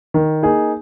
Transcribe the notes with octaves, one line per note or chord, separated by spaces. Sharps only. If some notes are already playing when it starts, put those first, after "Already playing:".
D#3
A#3 D#4 G#4